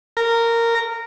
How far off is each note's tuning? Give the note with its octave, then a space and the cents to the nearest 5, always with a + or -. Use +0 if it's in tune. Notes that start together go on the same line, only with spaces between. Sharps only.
A#4 -10